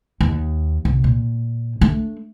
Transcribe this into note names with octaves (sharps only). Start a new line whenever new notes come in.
D#2
C2
A#2
A3 D4